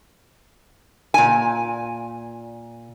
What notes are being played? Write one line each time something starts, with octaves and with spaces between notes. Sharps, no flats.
A#2 G#5